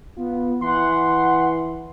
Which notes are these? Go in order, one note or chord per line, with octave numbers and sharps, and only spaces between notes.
B3 F4
E3 F#5 C6